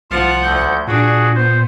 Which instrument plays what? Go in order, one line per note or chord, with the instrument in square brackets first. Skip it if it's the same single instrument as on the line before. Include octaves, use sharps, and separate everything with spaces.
[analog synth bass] C2 [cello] F3 F#5 [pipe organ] F4 A5 F6
[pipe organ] D2 G6
[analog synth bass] A#2 [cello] D4 [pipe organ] F#4 G#4
[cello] B3 [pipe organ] C5